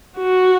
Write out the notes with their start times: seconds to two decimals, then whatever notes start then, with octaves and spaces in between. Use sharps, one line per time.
0.18 F#4